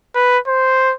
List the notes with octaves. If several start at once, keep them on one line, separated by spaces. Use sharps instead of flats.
B4
C5